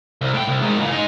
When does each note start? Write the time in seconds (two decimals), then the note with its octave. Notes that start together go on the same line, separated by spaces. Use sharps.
0.21 C2
0.34 A2 G5
0.48 C2
0.62 G#2 D#3
0.78 A#2 C#3
0.92 D#4 G#4